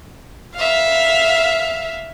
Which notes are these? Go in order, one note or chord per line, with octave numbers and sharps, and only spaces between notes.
E5 F5